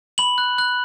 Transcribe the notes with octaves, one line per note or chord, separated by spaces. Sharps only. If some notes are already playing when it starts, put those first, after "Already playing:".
B5 F#7
F#6
F#6